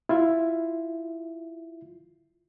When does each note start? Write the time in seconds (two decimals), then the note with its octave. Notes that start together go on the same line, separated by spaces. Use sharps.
0.09 E4 F4 E5